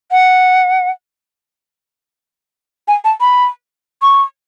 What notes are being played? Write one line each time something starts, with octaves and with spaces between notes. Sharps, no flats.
F#5
G#5
A5
B5
C#6